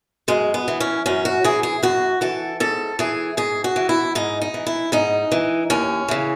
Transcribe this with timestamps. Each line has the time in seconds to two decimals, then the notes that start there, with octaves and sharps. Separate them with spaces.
0.28 F#2 G#3
0.54 B3
0.68 E3
0.80 C#4
1.06 F#2 C#4
1.25 F#4
1.44 E3 G#4
1.63 G#4
1.83 F#2 F#4
2.21 E3 A4
2.60 G#2 A4
2.99 E3 G#4
3.37 G#2 G#4
3.64 F#4
3.76 E3
3.89 E4
4.15 G#2 D#4
4.42 D#4
4.54 E3
4.67 E4
4.92 G#2 D#4
5.32 E3
5.70 D#2 C#4
6.08 C#3 E3